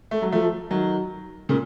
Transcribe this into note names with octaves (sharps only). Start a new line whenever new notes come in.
A3
F#3
F3 A3
D#3 F#3
A#2 C#3